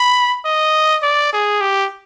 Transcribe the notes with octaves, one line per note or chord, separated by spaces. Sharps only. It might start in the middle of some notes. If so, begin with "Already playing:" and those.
Already playing: B5
D#5
D5
G#4
G4